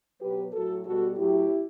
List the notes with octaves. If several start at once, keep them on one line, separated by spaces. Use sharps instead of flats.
B2 F#3 G4 B4
A2 F#3 F#4 A4
B2 G3 F#4 A4
A2 F#3 E4 G4